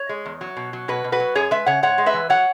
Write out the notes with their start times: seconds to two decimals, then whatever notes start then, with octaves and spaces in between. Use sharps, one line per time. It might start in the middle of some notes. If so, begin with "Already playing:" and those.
Already playing: C#5
0.09 G#3
0.25 E2
0.41 F#3
0.57 B2
0.73 F#3
0.88 B2 F#4 B4
1.04 B2
1.12 F#4 B4
1.20 F#3
1.35 F#2 G#4 C#5
1.51 G#3 B4 E5
1.66 C#3 C#5 F#5
1.83 G#2 C#5 F#5
1.98 G#3
2.06 B4 E5
2.14 E3
2.30 F#3 C#5 F#5